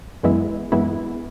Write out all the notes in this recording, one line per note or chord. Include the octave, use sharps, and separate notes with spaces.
F#2 E3 G#3 B3 E4
F#2 E3 G#3 B3 E4